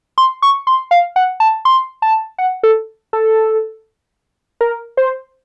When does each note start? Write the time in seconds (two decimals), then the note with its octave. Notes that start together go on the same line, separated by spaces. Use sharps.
0.18 C6
0.42 C#6
0.67 C6
0.91 F5
1.16 F#5
1.40 A5
1.65 C6
2.02 A5
2.38 F#5
2.63 A4
3.13 A4
4.61 A#4
4.97 C5